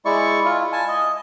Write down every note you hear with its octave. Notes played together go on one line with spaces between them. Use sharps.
G#3 E4 D5 C#6
E4 F4
G#5 A5
D#5